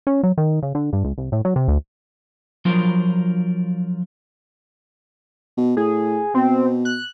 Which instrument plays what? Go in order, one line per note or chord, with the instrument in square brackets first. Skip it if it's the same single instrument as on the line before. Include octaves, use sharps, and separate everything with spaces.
[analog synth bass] C#4
F#3
D#3
C#3
D3
G2
C#2
C2
A2
F#3
C3
D2
[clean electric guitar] F3 F#3 D4 F4 A#4 C5
[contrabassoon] B2
[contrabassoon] A2 [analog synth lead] G#4
[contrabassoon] B2 [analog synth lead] C4
[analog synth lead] F#6